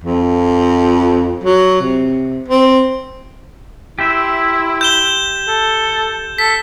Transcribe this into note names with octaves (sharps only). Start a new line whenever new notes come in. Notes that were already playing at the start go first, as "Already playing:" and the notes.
F2
F#3
C3
C4
E4 G4 C5 E5
G6 E7 G7
A4
A4 B6